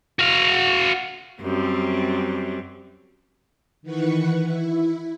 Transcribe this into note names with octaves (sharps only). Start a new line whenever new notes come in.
F#4 F5
F#2 G3 C4
D#3 E3 B4 F#5 C#6
E4